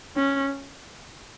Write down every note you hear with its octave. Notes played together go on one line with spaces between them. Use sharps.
C#4